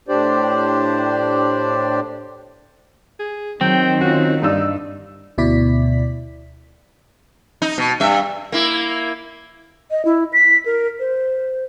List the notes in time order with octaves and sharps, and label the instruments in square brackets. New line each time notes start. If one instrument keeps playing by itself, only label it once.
[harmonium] A2 D4 G4 C5 D5
[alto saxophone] G#4
[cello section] D#3 [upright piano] F#3 [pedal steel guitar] C4 [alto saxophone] G5
[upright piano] C#4 F4 [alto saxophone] F#4
[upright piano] G2 D5 E6 [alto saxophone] D#4
[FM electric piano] D2 B2 E4 D5 B6
[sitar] D#4
B2
G2 E5
A#3 E4
[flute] D#5
E4
B6
A#4
C5